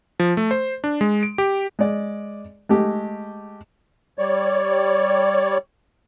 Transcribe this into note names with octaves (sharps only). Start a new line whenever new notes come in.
F3
A3
C5
D4
G#3
D7
G4
G#3 D5
G#3 A3 G4
G3 C#5 D5